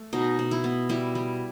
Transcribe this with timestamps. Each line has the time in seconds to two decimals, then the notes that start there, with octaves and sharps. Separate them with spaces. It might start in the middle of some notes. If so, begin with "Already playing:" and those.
Already playing: A3
0.13 B2 D#4
0.39 B2
0.51 E4
0.64 B3
0.89 G3 E4
1.15 G3